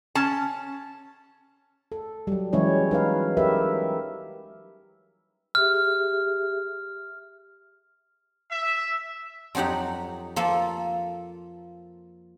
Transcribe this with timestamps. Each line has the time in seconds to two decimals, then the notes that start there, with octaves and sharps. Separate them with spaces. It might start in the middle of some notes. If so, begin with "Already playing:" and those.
0.15 C#4 A5
1.92 A4
2.27 F#3 G3
2.53 E3 F#3 G#3 C#4 E4 C#5
2.91 D#4 B4 F5
3.37 G4 A#4 B4 E5
5.55 G4 G#4 E5 F6
8.51 E5
9.55 F2 F#3 D#4 G4 F#5
10.36 F3 A#3 A4